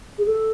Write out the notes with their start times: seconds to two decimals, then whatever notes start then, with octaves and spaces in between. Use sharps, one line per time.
0.18 G#4
0.26 A4